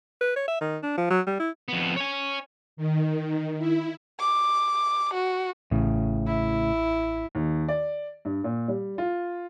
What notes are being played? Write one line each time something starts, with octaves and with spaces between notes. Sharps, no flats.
B4
C#5
E5
D#3
D4
F3
F#3
G3
E4
F2 B3
C#5 G#5
D#3
E4
D6
F#4
A1 A2 C#3
E4
D#2
D5
G2
A#2
G3
F4